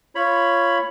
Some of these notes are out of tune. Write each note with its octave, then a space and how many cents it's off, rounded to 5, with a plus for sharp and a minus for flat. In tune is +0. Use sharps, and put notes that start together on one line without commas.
F4 -20 C#5 +0 B5 +0